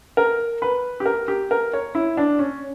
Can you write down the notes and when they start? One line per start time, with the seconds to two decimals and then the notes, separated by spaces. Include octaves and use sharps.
0.17 A#4
0.62 B4
1.00 G4
1.06 A#4
1.28 G4
1.51 A#4
1.73 C#5
1.95 E4
2.17 D4
2.39 C#4